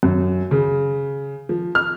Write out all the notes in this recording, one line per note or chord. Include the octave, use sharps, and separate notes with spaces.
F#2
C#3
F3
F6